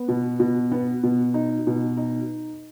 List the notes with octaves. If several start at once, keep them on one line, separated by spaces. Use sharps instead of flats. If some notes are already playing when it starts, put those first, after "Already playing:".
Already playing: B3
B2
B2
B3
B2
D#4
B2
D#4